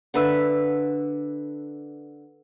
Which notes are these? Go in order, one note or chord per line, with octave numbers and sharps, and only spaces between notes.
D3 B4 E5